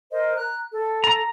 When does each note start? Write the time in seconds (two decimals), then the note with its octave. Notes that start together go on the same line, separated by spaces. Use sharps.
0.11 A#4 C5 D#5
0.35 A#5 F#6
0.71 A4
1.04 A#5